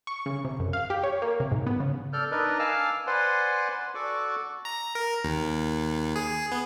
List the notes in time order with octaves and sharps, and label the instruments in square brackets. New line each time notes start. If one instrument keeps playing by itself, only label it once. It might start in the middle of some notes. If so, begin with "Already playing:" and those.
[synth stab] C#6
C#3
C3
F#2
F5
G4
C#5
A#3
C3
G#2
B3
C#3
[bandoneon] A4 D5 F6 G6
D4 D#4 A#4 B4 D5 D#5
F5 G#5 A5 D6 E6 F6
B4 C5 D5 F#5 G#5 C6
F#4 A4 D5 F#5 C#6 D6
[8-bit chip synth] A#5
A#4
D#2
G#4
B3